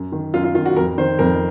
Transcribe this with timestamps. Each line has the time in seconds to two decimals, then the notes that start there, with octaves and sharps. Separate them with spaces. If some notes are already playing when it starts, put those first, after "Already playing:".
Already playing: F#2
0.12 D#3
0.34 F#2 F4
0.44 F4
0.55 D#3 F4
0.65 F#4
0.76 F2 A#4
0.98 D#3 C5
1.19 F2 A#4